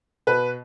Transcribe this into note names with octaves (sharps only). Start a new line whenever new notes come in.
B2 B4